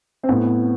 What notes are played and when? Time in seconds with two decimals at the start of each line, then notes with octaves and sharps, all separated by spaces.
0.23 C4
0.29 A2 B3